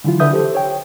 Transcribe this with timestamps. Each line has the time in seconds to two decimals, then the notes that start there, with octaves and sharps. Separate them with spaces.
0.04 D3 E3 F#3 E4 F4
0.20 D3 D4 B4 E5 D#6 G6
0.33 G4 A4 C5
0.55 C#5 G5